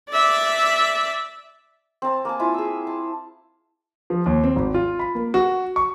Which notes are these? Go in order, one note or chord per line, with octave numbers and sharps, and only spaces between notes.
D5 E5
C4 A5
A#3 G#5 A5
E4 F4 G#5
G#4 E6
A5
F3
D#2
C4
G#1
F4
B5
A#3
F#4
C#6